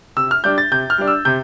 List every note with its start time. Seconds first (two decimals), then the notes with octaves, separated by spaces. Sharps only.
0.16 C3 E6
0.31 F6
0.44 G3 D4 G6
0.58 A6
0.71 C3 G6
0.90 F6
0.98 G3 D4
1.08 E6
1.25 C3 G6